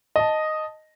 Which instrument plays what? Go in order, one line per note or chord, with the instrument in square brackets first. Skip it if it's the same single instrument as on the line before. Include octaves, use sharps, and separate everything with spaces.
[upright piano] D#5 A5